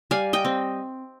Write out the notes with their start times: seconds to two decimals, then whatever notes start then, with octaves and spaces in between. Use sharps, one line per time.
0.11 G3 F5 G#5
0.33 D#5 G5
0.45 C4